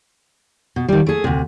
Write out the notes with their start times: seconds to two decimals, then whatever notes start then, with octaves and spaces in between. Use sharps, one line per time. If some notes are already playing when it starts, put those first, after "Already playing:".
0.76 B2
0.88 D#3 G3
1.07 A3 G#4
1.24 D2 C3